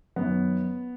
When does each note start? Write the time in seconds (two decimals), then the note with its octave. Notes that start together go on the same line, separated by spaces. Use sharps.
0.16 F#2 D#3 B3